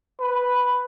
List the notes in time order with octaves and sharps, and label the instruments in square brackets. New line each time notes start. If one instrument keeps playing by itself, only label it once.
[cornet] B4